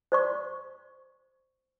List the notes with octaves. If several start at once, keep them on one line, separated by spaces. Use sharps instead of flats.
C5 D5 C#6